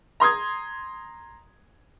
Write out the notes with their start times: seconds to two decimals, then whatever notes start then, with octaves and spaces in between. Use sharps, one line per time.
0.20 A#5 C6 D#6 G#6